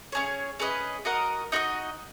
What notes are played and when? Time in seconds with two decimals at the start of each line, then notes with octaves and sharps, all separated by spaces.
0.12 C#4 G#4 C#5
0.59 C#4 G#4 B4 D#5
1.05 F#4 A#4 D#5 F#5
1.52 D#4 F#4 B4 D#5